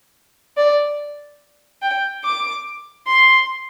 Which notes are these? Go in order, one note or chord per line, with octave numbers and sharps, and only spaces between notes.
D5
G5
D6
C6